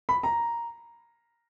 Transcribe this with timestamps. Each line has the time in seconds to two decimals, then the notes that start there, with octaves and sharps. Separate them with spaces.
0.09 B5
0.23 A#5